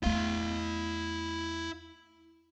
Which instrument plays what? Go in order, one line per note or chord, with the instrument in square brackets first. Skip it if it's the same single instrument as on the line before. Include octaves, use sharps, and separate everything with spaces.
[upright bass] E2 A3 [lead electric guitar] E4 F5